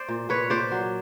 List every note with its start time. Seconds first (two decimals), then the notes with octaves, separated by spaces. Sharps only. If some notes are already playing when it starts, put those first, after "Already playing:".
Already playing: C5 D5
0.08 A#2
0.29 A#2 B4 C#5
0.50 A#2 C5 D5
0.72 F#3